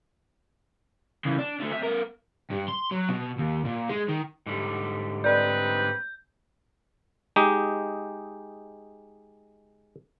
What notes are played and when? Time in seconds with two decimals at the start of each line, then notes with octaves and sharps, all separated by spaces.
1.25 C#3 E3
1.39 D4
1.60 D3 A3
1.71 C3 E5
1.83 B3 A#4
2.51 G2
2.69 C6
2.91 F#3
3.09 B2
3.39 D#2
3.65 A#2
3.89 G#3
4.08 D#3
4.46 G#2 D3 G3
5.24 C4 D#4 B4 D5 G6
7.36 G#3 D#4 G4